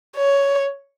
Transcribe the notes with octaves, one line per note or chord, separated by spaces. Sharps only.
C#5